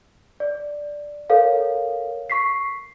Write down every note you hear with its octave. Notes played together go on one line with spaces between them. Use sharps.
D5
A4 A#4 C#5 F5
C#6 B6 C7